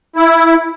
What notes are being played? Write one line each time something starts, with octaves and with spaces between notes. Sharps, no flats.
E4